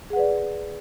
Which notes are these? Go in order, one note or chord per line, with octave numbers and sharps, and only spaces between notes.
G#4 B4 D5 F#5